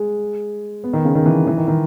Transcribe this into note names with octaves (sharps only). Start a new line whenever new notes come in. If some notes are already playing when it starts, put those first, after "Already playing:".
Already playing: G#3
B3
D#3
C#3
D#3
E3
E3
D#3
D#3